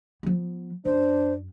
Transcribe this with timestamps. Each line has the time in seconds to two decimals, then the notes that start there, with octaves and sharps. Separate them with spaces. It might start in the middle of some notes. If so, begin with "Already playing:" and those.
0.23 F3 B3
0.85 F#2 D4 C5